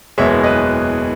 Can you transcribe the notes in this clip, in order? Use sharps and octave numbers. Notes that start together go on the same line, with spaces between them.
F#1 E2 B2 G#3 C#5 E5
B4 D#5